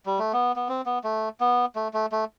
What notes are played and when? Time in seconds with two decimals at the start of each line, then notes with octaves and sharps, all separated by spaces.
0.06 G3
0.19 A3
0.33 B3
0.56 B3
0.69 C4
0.86 B3
1.04 A3
1.40 B3
1.76 A3
1.94 A3
2.12 A3